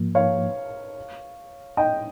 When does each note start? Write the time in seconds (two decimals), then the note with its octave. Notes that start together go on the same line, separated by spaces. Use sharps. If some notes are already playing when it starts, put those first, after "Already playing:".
Already playing: G#2 F3 A#3
0.15 C#5 F5
1.77 D#5 G5